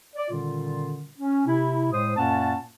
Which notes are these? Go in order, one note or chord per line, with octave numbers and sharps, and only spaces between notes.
D5
A#2 D3 D#3 G3 C#4 F4
C#4
C3 E4
A2 G#3 C5 D#6
F#2 A#2 A#3 C#4 F#5 A5